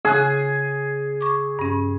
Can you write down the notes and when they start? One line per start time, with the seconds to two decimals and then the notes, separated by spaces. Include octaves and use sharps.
0.05 C#3 G#4 F#6
1.21 C#6 D6
1.59 G2 C#4